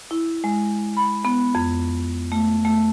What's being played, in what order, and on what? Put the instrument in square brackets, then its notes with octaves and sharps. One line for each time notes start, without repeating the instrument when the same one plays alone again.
[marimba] E4
G#3
B5
B3
F2
A3
A3